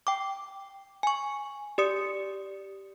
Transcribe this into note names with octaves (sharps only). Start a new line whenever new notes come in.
G5 D6
G#5 C#6
G4 D5 D#6 C#7